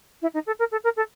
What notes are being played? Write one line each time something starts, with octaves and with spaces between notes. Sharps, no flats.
E4
D#4
A4
A#4
A4
A#4
A4